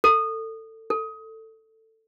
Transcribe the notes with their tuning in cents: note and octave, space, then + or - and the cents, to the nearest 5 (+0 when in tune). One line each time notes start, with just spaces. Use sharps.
A4 +20
A4 +10